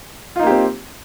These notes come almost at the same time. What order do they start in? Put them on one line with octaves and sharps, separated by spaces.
F4 D#4 A#3 G4 C4